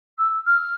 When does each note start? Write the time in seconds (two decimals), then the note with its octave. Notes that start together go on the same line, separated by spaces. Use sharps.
0.18 E6
0.46 F6